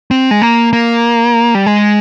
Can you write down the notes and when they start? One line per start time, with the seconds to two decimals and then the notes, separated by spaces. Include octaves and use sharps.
0.11 C4
0.31 G#3
0.42 A#3
0.73 A#3
1.55 G3
1.66 G#3